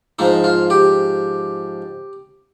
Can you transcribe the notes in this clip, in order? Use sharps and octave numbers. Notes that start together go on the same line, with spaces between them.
G#2 F3 D#4
F4
G4